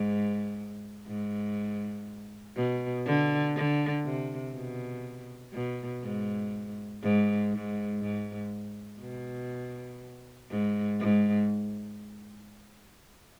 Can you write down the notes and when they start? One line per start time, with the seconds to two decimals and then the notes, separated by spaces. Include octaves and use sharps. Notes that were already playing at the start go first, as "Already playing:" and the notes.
Already playing: G#2
1.07 G#2
2.56 B2
3.05 D3
3.56 D3
4.05 C3
4.54 B2
5.53 B2
6.03 G#2
7.03 G#2
7.52 G#2
8.02 G#2
9.00 B2
10.50 G#2
11.00 G#2